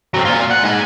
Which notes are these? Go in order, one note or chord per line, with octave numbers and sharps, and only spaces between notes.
F#3 C4
A#2 F4
F#5
G#2 G#5